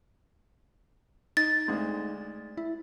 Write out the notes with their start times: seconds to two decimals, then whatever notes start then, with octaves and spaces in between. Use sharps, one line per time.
1.37 D#4 A6
1.68 D2 G#3
2.57 E4